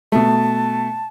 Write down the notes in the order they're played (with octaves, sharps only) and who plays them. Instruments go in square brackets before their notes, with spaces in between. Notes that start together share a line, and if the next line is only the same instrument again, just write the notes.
[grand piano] B2 A3 [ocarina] A5